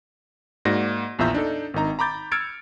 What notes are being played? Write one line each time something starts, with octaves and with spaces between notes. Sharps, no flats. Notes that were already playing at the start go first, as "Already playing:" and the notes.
G#2 A#3 F#4 D5 A#6
A#1 E2 F4 E5 A#5 G6
D4 D#4 A4
G#1 D#3 D#4 A#5
A#5 B5 D6 G6 A6
E6 F6 G#6 A6 C#7 D7